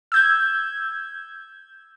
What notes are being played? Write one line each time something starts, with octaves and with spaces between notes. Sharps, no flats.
E6 G6 G#6